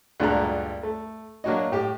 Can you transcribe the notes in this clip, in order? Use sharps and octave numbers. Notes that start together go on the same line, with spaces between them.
D2 G2 A#2 G#3 A#5 F#6
A3
F#3 A#3 D4 F#4 C#5 D#5
A2 G4